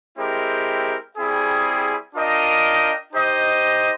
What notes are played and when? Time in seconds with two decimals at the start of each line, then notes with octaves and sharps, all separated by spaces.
0.18 G#3 C4 E4 G4 A#4
1.16 G3 C4 E4 G#4
2.15 D4 F4 A#4 D#5 G5
3.13 D#4 G4 C5 D#5